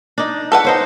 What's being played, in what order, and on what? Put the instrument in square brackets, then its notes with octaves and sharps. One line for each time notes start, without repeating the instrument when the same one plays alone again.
[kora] D4 D#4
[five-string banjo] A4 B4 F#5
[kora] D#4 C5 C#5